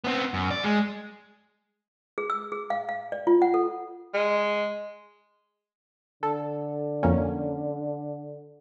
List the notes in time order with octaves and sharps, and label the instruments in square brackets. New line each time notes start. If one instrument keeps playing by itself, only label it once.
[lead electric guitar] B3 C4
F#2
D5
G#3
[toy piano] G#4
E6
G#4
F5
F5
D5
F4
F#5
A4
[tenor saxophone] G#3
[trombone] D3 [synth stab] A4
[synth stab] F2 A#3 C#4